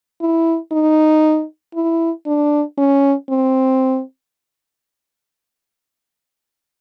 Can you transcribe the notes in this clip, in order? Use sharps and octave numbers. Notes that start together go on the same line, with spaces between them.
E4
D#4
E4
D4
C#4
C4